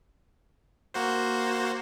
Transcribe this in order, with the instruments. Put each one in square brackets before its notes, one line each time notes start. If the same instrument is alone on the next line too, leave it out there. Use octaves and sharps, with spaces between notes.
[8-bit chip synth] A#3 F#4 C5